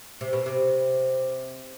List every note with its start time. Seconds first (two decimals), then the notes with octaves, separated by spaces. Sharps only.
0.21 C3
0.33 B2
0.46 C3